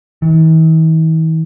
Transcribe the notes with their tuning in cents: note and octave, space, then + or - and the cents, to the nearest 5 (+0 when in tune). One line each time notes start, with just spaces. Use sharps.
E3 -45